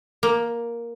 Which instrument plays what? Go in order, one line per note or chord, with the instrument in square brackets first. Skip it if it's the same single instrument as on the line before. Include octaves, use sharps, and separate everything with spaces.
[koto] A#3